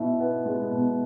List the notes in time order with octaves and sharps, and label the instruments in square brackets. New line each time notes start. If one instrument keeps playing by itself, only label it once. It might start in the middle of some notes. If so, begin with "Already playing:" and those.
Already playing: [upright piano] B2 E4
B3
G#3
B2